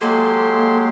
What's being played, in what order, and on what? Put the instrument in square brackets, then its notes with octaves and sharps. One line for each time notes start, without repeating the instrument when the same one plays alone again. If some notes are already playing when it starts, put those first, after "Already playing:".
[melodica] F#3 G#3 G4 [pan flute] A#3 [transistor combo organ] A4 C6